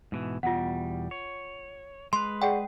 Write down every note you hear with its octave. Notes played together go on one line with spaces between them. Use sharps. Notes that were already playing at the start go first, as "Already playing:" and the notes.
G#2 B2 E3
E2 B2 G3 F4 F#5
C#5
G#3 B4 C6
G#4 D5 F#5 G5